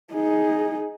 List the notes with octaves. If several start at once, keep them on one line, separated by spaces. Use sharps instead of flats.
D#4 G#4